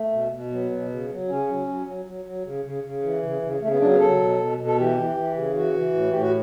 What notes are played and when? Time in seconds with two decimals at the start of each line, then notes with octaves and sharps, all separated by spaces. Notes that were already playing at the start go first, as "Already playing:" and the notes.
Already playing: A3
0.12 B2
0.32 B2
0.51 F#3 B3
0.71 B2
0.89 C#3
1.09 F#3
1.29 C#3 C#4
1.47 F#3
1.67 F#3
1.86 F#3
2.05 F#3
2.25 F#3
2.44 C#3
2.65 C#3
2.83 C#3
3.03 E3
3.23 C#3
3.42 C#3
3.61 C#3 A3
3.71 B3
3.80 F#3 D4
3.91 B3
3.99 F#3 A4
4.20 B2
4.39 B2
4.59 B2
4.67 A4
4.78 E3 G4
4.97 E3
5.16 E3
5.35 C#3
5.55 E3 F#4
5.74 E3
5.94 A2
6.11 A2 G4
6.21 F#4